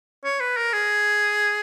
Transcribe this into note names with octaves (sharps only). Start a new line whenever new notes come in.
C#5
B4
A#4
G#4